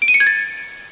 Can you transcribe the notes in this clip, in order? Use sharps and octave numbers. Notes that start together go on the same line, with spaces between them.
D7
D#7
C#7
G#6
A6